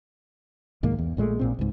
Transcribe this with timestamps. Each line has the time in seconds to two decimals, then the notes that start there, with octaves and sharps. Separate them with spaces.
0.83 C2 G#2 D#3 A#3
0.98 E2
1.17 A#1 A#2 G#3 A3
1.39 A#1 A#2 C4
1.59 C#2 G#2